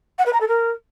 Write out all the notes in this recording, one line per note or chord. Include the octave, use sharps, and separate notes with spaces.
F#5
B4
A#5
A4
A#4